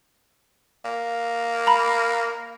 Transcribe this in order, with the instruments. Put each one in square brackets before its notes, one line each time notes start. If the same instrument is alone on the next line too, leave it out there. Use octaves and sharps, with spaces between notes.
[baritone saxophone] A#3
[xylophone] A#5 B5